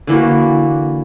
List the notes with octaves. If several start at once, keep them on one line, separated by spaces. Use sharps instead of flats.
D3 E3 A#3 F#4